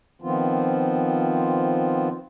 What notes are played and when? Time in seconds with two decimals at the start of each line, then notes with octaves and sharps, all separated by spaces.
0.22 D#3 F3 B3 C4 F4